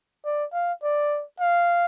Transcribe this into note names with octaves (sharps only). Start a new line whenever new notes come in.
D5
F5
D5
F5